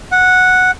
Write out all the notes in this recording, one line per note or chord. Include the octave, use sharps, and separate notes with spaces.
F#5